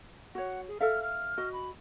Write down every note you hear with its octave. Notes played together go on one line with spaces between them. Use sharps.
F#4 C#5 F#5
G#4
A4 E5 F5 F6
F6
F#4 D#5
B5